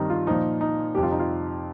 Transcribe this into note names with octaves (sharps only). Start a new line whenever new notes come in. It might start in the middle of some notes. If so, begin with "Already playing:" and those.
Already playing: G2 D#3 G3 C4 D#4
F4
A#2 F3 D#4
D#4
F2 C3 G3 G4
F4
D#4
F4